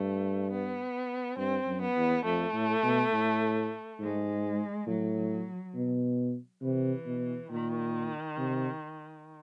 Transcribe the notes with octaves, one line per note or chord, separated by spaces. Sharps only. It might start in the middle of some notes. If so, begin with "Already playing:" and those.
Already playing: G2 A3
B3
G2 C4
F#2
B3
E2
F2 A3
A2
B2
A2
G#2 G#3
A2 F#3
B2
C3 E3
B2
A#2 D#3
C3